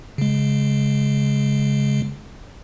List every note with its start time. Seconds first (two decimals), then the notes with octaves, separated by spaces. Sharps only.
0.18 C#3 G#3